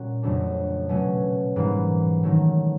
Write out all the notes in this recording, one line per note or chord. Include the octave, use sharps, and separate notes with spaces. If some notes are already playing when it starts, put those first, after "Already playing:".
Already playing: A#2 G3 A#3 C#4 F#4
F2 C#3 F#3 A3 D4
B2 F#3 A3 C#4
G#2 E3 G3 A#3
D#3 F#3 A3